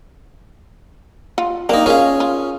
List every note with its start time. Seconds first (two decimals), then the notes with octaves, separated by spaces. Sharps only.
1.38 F4
1.69 A#3 C4 D4 D#4
1.86 C#4 F4 G#4 F5
2.20 F4